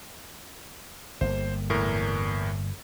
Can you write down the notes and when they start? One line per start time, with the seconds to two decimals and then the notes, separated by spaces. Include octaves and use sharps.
1.21 G1 G2 A#3 C5
1.70 E2 A2 A#4